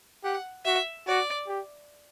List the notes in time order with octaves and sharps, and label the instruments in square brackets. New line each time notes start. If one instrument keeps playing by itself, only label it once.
[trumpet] G4 [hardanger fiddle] F#5
[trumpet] F#4 [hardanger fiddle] E5
[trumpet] F#4 [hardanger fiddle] D5
[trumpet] G4